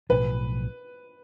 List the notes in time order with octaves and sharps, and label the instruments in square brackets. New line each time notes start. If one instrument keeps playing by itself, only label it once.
[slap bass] B1 A2 F3 [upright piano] B4